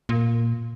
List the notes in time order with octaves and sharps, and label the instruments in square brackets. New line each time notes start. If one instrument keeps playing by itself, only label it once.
[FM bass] A#2